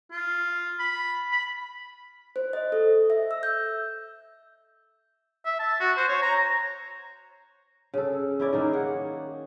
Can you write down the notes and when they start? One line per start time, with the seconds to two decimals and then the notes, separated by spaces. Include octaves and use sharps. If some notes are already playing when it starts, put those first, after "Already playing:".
0.11 F4
0.79 B5
1.32 B5
2.36 C5
2.53 D#5
2.72 A4
3.10 E5
3.31 E6
3.43 G6
5.45 E5
5.59 A5
5.80 F#4
5.97 C5
6.09 C#5
6.22 A#5
7.94 C#3 A4
8.39 C#4 E4 D5
8.53 D#3 A#3 D#4
8.73 G#4 F#5